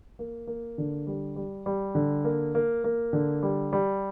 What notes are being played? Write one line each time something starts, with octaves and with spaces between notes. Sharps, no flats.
A#3
A#3
D3
G3
G3
G3
D3
A#3
A#3
A#3
D3
G3
G3